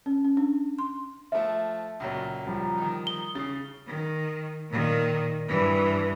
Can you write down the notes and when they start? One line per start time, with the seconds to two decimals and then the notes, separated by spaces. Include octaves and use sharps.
0.06 C#4
0.25 C#4
0.37 D4
0.79 C6
1.32 F3 A3 E5
2.00 C#2 A#2 F#3
2.47 F3 G3 A#5
2.77 D#3 D#4
3.07 D#6 G7
3.35 C#3 A6 C7
3.87 D#3
4.71 A#2 D#3
5.48 G2 E3